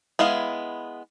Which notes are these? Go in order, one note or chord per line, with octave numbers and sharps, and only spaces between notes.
G#3 B3 E4 F5